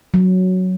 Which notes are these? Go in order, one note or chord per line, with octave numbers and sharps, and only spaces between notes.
F#3